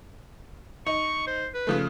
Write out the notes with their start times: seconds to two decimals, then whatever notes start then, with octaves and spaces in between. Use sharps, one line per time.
0.86 D#4 C#6
1.27 C5
1.54 B4
1.67 C#3 F3 A3